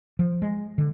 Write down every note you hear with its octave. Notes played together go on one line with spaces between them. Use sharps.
F3
G#3
D3